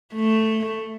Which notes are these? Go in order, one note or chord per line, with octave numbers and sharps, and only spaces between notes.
A3